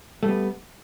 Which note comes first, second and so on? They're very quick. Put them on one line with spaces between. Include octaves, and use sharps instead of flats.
A3 G3 B3